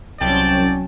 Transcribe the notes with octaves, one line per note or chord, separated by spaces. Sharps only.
C2 F#3 C#4 D5 G5 A5